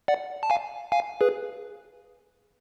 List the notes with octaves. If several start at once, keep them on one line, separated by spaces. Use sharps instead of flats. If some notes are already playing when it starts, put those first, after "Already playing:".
D5 F#5
A5
F5 G#5
F5 G#5
G#4 B4